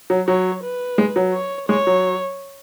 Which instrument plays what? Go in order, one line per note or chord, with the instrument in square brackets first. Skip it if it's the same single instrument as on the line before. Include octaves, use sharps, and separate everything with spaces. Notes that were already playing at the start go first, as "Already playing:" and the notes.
[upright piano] F#3
[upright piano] F#3 [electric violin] C#5
[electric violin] B4
[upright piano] G#3
F#3
[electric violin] C#5
[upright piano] G#3 [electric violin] C#5
[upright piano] F#3